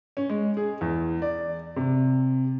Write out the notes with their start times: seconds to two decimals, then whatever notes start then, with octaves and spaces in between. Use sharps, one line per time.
0.17 C#4
0.29 G#3
0.57 G#4
0.81 E2
1.22 D5
1.76 C3